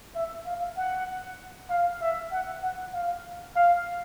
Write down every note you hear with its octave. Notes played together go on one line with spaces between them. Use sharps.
E5
F5
F#5
F5
E5
F#5
F#5
F5
F5